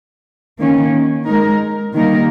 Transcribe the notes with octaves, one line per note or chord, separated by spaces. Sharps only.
D#3 A#3 C#4
G#3 D#4 A#4
D#3 G3 A#3 D#4 A#4